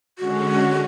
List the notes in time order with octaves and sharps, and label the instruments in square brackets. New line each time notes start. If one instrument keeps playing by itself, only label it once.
[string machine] D3 G#3 C#4 [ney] F#4